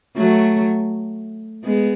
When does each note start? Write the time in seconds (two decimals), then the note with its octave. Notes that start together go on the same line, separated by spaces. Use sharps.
0.17 F#3 A3
1.64 G#3 B3